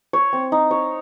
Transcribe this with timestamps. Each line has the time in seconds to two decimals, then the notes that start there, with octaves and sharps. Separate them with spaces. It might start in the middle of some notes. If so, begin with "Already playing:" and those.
0.13 C#5
0.33 C4
0.52 D#4
0.71 C#5